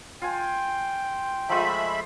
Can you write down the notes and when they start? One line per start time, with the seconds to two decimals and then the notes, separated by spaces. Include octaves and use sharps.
0.22 F4 G5 G#5
1.49 F3 G#3 A3 F4 E5 B5